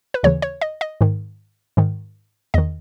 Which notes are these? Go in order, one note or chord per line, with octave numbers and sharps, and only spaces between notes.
B4
D#2 C#3 E3 C#5
C#5
D#5
D#5
G#2 D#3
G#2 D#3
E2 D#3 D#5